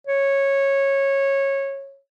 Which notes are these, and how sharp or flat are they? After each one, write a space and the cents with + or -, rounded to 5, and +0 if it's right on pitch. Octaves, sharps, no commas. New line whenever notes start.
C#5 -15